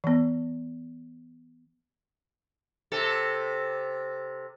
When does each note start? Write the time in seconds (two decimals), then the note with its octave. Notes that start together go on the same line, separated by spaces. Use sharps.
0.04 E3 B3
2.92 C3 A4